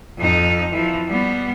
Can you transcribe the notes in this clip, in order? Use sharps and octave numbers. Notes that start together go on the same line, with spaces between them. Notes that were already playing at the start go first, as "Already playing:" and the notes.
F2 D#4
E3 F3
G3 B3